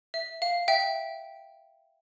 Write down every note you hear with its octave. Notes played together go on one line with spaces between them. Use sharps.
E5
F5
E5 G5